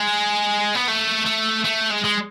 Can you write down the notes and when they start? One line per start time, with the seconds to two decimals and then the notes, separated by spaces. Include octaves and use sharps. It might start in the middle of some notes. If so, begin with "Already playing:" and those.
Already playing: G#3
0.75 B3
0.88 A3
1.26 A3
1.65 A3
1.91 G#3
2.04 G#3